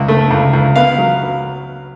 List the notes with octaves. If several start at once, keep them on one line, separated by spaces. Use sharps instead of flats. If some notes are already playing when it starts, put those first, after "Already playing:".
Already playing: C#2
A3
C#2
C#2
B3 F5
F#3